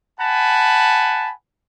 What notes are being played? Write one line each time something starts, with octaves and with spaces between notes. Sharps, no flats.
F#5 G#5 A5 B5